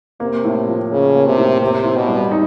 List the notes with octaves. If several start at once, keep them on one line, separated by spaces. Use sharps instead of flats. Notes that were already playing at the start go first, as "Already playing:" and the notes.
C3 A#3
A2
F3
C#3 C#4
A#3
C3
A2
C3 C4
E3
B2
G3
D#4